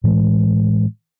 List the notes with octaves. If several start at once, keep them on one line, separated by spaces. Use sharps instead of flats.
A2 E3 G#3